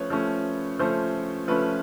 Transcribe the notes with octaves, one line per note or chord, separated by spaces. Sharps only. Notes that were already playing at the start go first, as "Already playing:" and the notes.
Already playing: F3 A3 C#4 B4 C#5
F3 A3 C#4
F3 A3 C#4 C5
F3 A3 C#4 B4